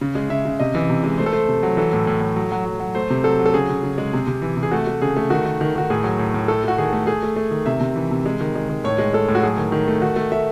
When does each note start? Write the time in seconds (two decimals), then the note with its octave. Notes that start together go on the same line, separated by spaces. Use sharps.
0.01 C#3
0.15 G#3
0.30 C#3 E5
0.45 C#3
0.60 C3 D#5
0.75 E3
0.90 C3
1.04 G#3
1.18 A3 C5
1.26 A4
1.33 A3 C5
1.48 C3
1.63 F#3
1.77 E3 A4
1.93 A2
2.07 A2
2.21 A2
2.36 F#3
2.52 F#3
2.66 F#3
2.80 F#3
2.95 A3 C5
3.10 C3
3.24 F#3 A4
3.39 F#3
3.46 A4
3.54 C#3 G#4
3.69 C#3
3.83 C#3
3.98 G#3
4.13 C3
4.27 C3
4.42 E3
4.57 C3
4.63 G#4
4.71 A3 F#4
4.87 A3
5.02 C#3 G#4
5.17 A3
5.30 D#3 F#4
5.45 D#3
5.61 D#3
5.76 D#3 F#4
5.90 A2 G#4
6.04 F#3
6.19 A2
6.34 A2
6.48 A3 A4
6.64 A3 F#4
6.78 D#3 G#4
6.93 A3
7.07 A3 G#4
7.23 A3
7.36 A3
7.51 D#3
7.66 C3 E5
7.81 C3
7.96 E3
8.11 C3
8.26 G#3
8.41 D#3
8.55 G#3
8.69 D#3
8.84 A2 C#5
8.98 G#3
9.13 G#3 A4
9.28 A2
9.35 F#4
9.42 F#3 G#4
9.57 D#3
9.72 D#3
9.88 A3
10.02 D#3 F#4
10.16 A3
10.32 A3 E5